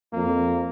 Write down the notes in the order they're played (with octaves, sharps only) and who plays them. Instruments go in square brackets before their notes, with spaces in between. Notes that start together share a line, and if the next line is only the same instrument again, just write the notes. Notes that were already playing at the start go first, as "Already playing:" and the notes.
[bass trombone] F2 [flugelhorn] A#3